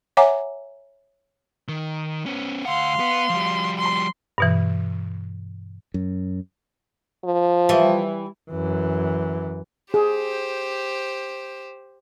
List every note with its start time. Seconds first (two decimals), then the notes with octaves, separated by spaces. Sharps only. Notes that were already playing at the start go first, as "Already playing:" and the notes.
0.17 C#5 E5 F#5 G#5 A#5 D6
1.68 D#3
2.26 B3 C#4
2.65 D2 F5 F#5 C6
3.00 B3
3.29 F3 G3
3.79 C6
4.38 G2 B2 E3
5.94 F#2
7.24 F3
7.69 E3 G3
8.50 F#2 E3
9.94 G4 G#4 C5